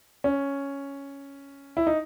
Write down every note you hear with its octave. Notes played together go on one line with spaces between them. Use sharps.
C#4
E4
D#4